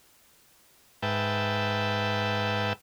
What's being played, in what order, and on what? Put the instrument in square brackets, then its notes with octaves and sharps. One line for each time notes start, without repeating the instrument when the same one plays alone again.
[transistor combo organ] G#2 B4 E5 G5 A5